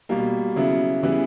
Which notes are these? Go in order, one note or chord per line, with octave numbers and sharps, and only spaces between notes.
B2 G3 A#3
C#3 F#3 B3 E4
C#3 E3 G3 B3 E4